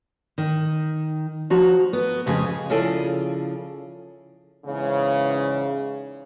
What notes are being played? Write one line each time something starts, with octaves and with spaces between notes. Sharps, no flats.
D#3
F3 F#4 A#5
B3
F2 C#3 G#3 G#4
C#3 F3 E4 G#4 A4 D5
E2 G#2 C#3